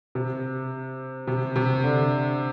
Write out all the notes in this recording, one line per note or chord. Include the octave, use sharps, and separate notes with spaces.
C3
C3
C3
D3